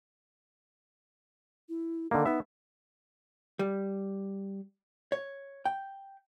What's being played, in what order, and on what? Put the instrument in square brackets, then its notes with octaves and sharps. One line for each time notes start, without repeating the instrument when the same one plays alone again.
[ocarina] E4
[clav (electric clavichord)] D3 D#3 A#3 [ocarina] A4
[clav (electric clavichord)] B3 E5 [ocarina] D#4
[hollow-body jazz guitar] G3
C#5
G5